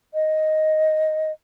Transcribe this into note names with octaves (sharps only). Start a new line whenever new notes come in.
D#5